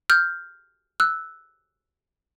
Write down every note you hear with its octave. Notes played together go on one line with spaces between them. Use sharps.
F6 G6
E6 F#6